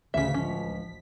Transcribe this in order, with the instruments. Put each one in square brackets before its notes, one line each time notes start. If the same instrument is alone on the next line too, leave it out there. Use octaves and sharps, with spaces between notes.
[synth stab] A1 D2 B6 [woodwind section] C#3 [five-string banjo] C#4 E5
[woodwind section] C#2 F3 [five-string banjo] C#4